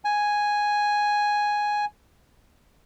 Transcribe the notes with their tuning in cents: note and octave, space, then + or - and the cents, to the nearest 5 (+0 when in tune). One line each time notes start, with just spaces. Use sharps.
G#5 +0